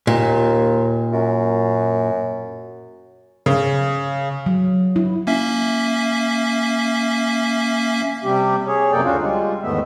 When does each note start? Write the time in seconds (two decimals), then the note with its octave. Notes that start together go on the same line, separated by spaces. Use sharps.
0.07 D#2 A#2
1.12 F#2
3.46 C#3
4.46 F#3
4.96 E4
5.27 A#3 C#4 E5
8.24 C3 G3 G4
8.67 G#4 C#5
8.92 F#2 C3 A#3 A4 D5 G5
9.05 D2 C#4 D4 F4 F#4 F5
9.19 G3 G#3 F4
9.63 E2 G#2 D#3 A3 B3 E5